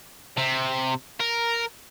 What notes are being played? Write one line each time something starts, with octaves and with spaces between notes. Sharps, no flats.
C3
A#4